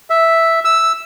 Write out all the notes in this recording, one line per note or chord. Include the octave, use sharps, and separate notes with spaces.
E5
E6